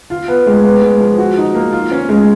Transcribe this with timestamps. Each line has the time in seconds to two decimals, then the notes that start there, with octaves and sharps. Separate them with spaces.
0.10 F4
0.28 B3
0.46 G#3
0.64 B3
0.82 G#3
1.00 F3
1.18 F#4
1.37 D#4
1.54 A#3
1.72 F4
1.91 C#4
2.09 G#3